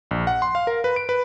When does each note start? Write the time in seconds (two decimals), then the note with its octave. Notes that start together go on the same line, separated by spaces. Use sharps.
0.11 A#1
0.27 F#5
0.42 C6
0.55 F5
0.67 A#4
0.84 B4
0.96 D7
1.09 B4